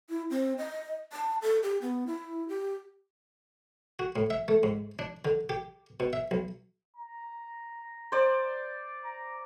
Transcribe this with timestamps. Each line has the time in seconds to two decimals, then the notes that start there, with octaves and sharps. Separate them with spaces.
0.09 E4
0.30 C4
0.58 D#5
1.12 A5
1.42 A4
1.63 G4
1.82 B3
2.07 E4
2.48 G4
3.99 F#4
4.16 A2
4.30 E5
4.48 A3
4.63 G#2
4.99 D4
5.25 D3
5.49 G4
6.00 B2
6.13 E5
6.31 B1
6.97 A#5
8.12 C5 D5
9.04 A#5